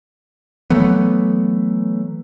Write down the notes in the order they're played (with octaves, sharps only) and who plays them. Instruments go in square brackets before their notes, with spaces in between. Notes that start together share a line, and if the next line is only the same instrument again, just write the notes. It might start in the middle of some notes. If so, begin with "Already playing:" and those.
[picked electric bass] E3 F#3 A3 B3